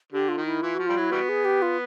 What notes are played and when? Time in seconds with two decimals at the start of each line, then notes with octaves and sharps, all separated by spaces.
0.12 D3 G4
0.29 F4
0.37 D#3
0.46 E4
0.63 E3 F4
0.75 F3 F#4
0.86 G3 F4
0.95 F#3 E4
1.12 E3 G3 B3 F#4
1.29 G#4
1.45 G4
1.62 F4